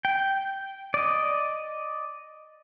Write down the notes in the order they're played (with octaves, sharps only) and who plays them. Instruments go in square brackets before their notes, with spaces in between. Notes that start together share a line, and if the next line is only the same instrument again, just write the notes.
[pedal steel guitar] G5
D5 D#5